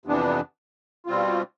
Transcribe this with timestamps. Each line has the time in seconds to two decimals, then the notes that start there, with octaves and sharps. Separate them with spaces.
0.05 F2 C3 E3 B3 D4
1.06 B2 G3 C4 F4